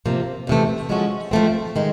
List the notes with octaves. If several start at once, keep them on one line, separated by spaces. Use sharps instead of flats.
C3 F3 A#3
F2 C3 E3 A3
F3 G#3 C#4 F#4 A4
F3 A3 C4
D#3 G#3